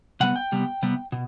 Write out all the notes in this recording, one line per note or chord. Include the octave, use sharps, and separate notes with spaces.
C3 G3 B3 F#5
G5
C3 G3 B3
C3 G3 B3
B2